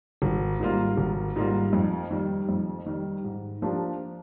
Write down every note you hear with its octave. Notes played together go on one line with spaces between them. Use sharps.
G#1
G#2 G3 A#3 F4
G#1
G#2 G3 A#3 F4
F2
D#3 G3
F2
D#3 G3
G#2
F3 A#3 D4 G4